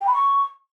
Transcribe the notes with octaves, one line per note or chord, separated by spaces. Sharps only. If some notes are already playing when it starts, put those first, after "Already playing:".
G5
B5
C#6